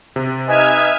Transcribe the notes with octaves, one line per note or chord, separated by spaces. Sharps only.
C3
D#4 B4 D#5 E5 G#5 F6 G#6